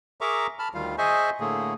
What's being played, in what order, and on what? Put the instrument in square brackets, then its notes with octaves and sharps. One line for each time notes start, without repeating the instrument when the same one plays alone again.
[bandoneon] G#4 A#4 E5 A#5 C#6 D6
A5 B5 F6
D2 D#3 G3 F4 F5
G#4 C5 D#5 E5 G#5 C#6
A2 D3 A3 A#3 G#4